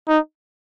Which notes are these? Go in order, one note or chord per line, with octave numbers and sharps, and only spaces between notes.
D#4